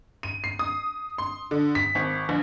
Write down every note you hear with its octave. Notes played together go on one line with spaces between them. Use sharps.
D#7
C7
D#6
C6
D3
B6
G#1
A#1